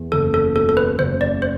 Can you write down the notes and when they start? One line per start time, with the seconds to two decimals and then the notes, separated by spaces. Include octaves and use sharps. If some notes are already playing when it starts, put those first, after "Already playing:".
Already playing: E2
0.12 F#1 A4
0.34 A4
0.56 B2 A4
0.69 A4
0.77 B4
0.99 F#1 C5
1.21 D5
1.42 C5